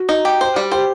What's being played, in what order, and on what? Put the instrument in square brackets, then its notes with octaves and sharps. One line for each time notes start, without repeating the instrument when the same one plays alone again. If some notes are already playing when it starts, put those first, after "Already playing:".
Already playing: [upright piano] F#4
[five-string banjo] D#4
G4
C5
G3
[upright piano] G4 [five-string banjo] C5